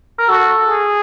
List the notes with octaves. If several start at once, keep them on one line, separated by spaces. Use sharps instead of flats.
A#4
F#4 A4
G#4